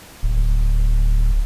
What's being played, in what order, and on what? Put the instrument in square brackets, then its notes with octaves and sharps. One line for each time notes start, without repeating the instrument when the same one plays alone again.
[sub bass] D1